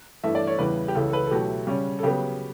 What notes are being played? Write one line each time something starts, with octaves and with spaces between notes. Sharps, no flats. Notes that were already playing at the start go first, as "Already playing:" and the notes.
G2 E3 A3 E5
D5
C#5
E2 C#3 E3 G3 B4
G4
C#2 C#3 E3 A4
A4
B4
A4
B2 F#3 A3 E4 G4
C#3 G3 C#4
A4
C#3 F#3 B3 G4